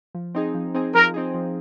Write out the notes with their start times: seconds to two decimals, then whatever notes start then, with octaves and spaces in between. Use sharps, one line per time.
0.15 F3
0.35 C4 D#4 G#4
0.54 F3
0.74 C4 D#4 G#4
0.94 F3 A#4
1.14 C4 D#4 G#4
1.34 F3